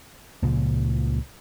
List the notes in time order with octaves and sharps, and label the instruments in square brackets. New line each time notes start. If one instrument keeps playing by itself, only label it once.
[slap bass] C#2 A#2 C#3 F3